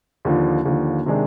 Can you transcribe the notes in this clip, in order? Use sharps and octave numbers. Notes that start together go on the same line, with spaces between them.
D#2 D3 F3
D#2 D3 F3
C3 D#3 G#3 D4